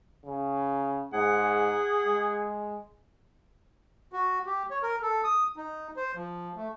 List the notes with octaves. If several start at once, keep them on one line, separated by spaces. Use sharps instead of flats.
C#3
G#2 G#4 F#5
G#3
F#4
G4
C#5
A#4
A4
D#6
D#4
C5
F3
A3